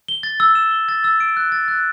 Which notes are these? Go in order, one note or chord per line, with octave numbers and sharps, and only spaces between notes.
G7
A6
E6
E7
G7
A6
E6
D7
F#6
A6
F#6